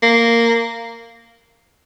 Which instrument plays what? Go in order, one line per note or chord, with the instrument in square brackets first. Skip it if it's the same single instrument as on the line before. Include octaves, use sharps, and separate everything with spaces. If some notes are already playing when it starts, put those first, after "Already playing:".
[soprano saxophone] A#3